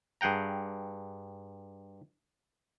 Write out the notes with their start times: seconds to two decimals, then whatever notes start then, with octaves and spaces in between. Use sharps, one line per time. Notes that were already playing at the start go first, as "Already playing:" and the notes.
0.21 G2 G#4 F#5 G5 A#5